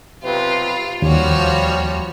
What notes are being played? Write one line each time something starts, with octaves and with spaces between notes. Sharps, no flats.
B1 C3 F4 B4
D#2 F3 G3 F#4 C#5